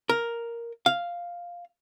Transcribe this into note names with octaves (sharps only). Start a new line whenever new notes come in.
A#4
F5